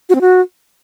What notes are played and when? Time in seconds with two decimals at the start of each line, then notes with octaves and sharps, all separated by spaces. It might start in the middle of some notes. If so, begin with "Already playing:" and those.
0.09 F#4
0.15 C4
0.21 F#4